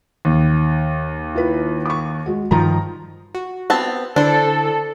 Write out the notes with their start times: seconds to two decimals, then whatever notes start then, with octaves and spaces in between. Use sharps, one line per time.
0.25 D#2
1.35 E4 F4 B4
1.86 C#6 D6
2.26 G#3 F#4
2.51 G2 D#3 F3 A#5
3.35 F#4
3.70 B3 C4 A5
4.16 D3 D4 E4 A4 C5